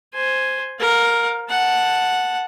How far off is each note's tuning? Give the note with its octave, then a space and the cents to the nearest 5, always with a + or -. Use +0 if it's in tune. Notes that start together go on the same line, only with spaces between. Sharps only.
C5 +0 G#5 +0
A#4 +0 F5 +35
F#5 -5 A5 +0